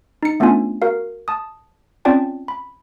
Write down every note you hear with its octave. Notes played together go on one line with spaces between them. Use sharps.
D#4 C#7
A3 B3 C#4 D4 F4 G#5
F#4 A#4 F5
A5 D#6
C4 C#4 F4 D5 G5 A5
B5